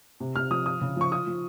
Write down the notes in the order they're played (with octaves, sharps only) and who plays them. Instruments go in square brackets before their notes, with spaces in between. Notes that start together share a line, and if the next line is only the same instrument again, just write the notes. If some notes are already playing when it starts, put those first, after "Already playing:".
[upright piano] C3
C3 F6
F3 D#6
F4 D#6
C#3
F3 C#6
F4 D#6
F3